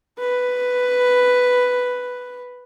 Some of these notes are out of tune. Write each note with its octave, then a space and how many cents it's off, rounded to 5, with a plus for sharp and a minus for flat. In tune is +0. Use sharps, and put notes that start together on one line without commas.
B4 +5